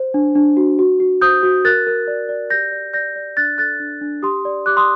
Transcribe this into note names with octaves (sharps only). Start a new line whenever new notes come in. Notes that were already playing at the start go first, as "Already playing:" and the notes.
Already playing: C5
D4
D4
F#4
F#4
F#4
C5 D#6 G6
F#4
A#4 F#6 A6
A#4
D5
D5
G4 G6 A#6
D5
D5 G6 A#6
D5
D4 F#6 A6
A4 F#6 A6
D4
D4
G4 C6 D#6
D5
G4 D6 F#6
C6 D#6